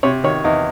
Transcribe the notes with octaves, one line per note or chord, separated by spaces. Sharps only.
C3 C#5
D#3 C#5
E2 D#4